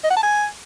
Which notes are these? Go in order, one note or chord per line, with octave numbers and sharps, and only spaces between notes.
D#5
F#5
A5
G#5